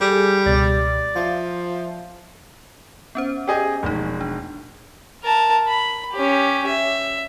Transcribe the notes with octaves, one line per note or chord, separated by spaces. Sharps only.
G3 G#4 A4 G#5
C#2 B2 D5
F3 E5 F5
B3 C#4 C5
G4 G#4 D#5
E1 F3 A3 D#4
D4
A#4 A5
B5
C#4 G4
E5